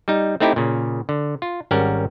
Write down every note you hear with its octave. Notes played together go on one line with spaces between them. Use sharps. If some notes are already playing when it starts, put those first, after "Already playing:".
G3 D#4
A3 C4 D#4 E4 G4
A#2 C#3
D3
F4
G#1 G3 C#4 A#4 F#5